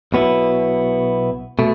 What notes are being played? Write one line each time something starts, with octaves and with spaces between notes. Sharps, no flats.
B1 B2 B3 E4
B2 A3